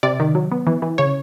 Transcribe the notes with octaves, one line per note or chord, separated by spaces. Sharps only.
C3 D5
D#3
F#3
B3
E3
E3
C#3 C#5